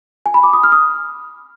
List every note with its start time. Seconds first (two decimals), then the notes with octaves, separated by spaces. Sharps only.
0.26 G#5
0.34 B5
0.43 D6
0.53 D#6
0.63 F6
0.72 D#6